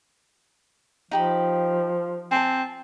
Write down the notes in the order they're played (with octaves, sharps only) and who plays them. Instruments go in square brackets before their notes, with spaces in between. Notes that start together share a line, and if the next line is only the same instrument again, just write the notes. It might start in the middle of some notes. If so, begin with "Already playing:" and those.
[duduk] F3 [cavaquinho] D#4 G4 B5
[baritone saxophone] C4 [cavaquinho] G#5 A5